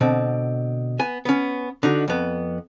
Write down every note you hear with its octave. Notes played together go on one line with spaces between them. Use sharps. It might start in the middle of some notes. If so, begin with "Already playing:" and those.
B2 D3 C4
B3 G#5
B3 C#4
D3 D#4 F#4
F2 B3